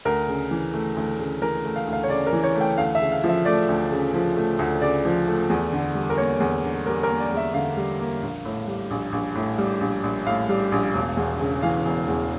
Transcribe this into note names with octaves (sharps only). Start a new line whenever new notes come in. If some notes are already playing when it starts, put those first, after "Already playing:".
D2 A#4
C#3
E3
A3
D2
C#3
E3 A#4
A3
F5
D2
F5
C#5
C#3 D5
A#4
E3
C#5
A3
G5
D2 F5
E5
C#3
F5
F3
E5
A3 D5
D2
C#3
F3
A3
D2
C#3 D5
F3
A3
E2
D3
G3
A#4
A#3 C#5
E2
D3
G3 A#4
A#4
A#3
D5
E2
E5
D3 F5
G3
A#3
A#1
A2
G3
A#1
A#1
A2
G3
A#1
A#1
A2 F5
G3
A#1
E1
E2
C#3
E3 F5
E1
E2